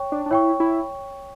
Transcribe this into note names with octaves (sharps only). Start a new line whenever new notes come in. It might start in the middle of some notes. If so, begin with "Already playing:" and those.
Already playing: C#5 G5 C#6
D4
D4
E4 C#5 G5 C#6
E4